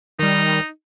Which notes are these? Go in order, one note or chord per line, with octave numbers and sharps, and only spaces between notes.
D#3 G3 D#4